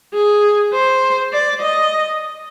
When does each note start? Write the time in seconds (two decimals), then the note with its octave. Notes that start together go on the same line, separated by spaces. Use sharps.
0.14 G#4
0.73 C5
1.33 D5
1.62 D#5